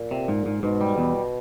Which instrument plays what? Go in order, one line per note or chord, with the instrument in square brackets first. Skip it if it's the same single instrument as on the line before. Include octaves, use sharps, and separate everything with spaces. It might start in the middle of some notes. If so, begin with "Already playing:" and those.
Already playing: [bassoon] A#2
[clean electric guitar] C3
G#2
G#2
[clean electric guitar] G#2 [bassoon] B2
[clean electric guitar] G3
E2